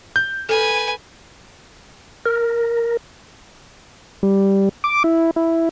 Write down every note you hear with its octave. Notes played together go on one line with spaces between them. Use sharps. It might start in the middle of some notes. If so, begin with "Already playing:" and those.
G6
A4 B4 G#5
A#4
G3
D6
E4
E4